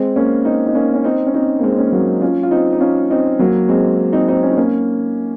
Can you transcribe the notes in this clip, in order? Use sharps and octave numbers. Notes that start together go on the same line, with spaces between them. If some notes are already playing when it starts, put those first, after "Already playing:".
Already playing: G#3 C4
A#3 C#4
C4 D#4
D#4
A#3 C#4
C#4
C4 D#4
C#4
C4 D#4
A#3
G#3 C4
A#3 C#4
F#3 A#3
C#4 F4
F4
C4 D#4
D#4
C#4 F4
C4 D#4
F#3 A#3
G#3 C4
C4 D#4
C4 D#4
C#4
D#4
A#3 C#4